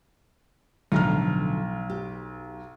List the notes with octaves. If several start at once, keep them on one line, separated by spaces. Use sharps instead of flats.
B1 A2 D3 F3 A#5 F6
G4